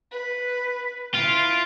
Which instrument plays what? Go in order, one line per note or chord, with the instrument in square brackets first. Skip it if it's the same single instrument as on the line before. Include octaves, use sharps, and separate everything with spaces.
[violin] B4
[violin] E4 D7 [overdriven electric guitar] F4